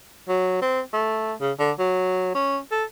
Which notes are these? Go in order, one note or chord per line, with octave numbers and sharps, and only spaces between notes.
F#3
C4
A3
C#3
D3
F#3
C#4
A4